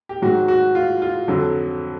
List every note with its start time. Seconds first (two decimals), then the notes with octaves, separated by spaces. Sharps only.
0.09 G4
0.22 G#2 D#3 F#3 F#4
0.48 F#4
0.75 F4
1.02 F4
1.28 F2 D3 F#3